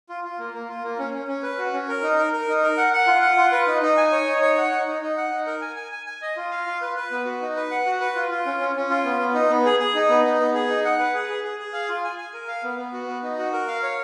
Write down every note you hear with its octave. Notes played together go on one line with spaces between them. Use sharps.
F4
F4
A#3
A#3
F4
A#3
C#4
C#4
C#4
B4
F#4
C#4
A#4
D#4
A#4
A#4
D#4
A#4
F#5
F#5
F4
F#5
F4
B4
D#4
D#4
G#5
C#5
D#4
C#5
F#5
D#4
D#4
D#4
F#5
D#4
A#4
G#5
G#5
G#5
G#5
D#5
F4
F5
F4
B4
B4
B3
F#4
D#4
B4
F#5
F#4
B4
F4
F4
C#4
C#4
C#4
F4
B3
B3
D#4
B3
G#4
G#4
D#4
B3
D#4
B3
G#4
D#4
F#5
B4
G#4
G#4
G#4
G#4
F5
F4
G#5
G#5
A#4
F5
B3
B3
F#4
B3
D#4
F#4
A#4
F5
C#5